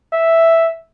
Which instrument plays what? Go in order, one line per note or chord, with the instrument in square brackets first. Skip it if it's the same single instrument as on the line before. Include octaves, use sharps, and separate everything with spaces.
[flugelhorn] E5